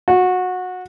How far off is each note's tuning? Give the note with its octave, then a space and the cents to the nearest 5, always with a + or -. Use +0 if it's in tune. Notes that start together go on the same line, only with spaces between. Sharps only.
F#4 -20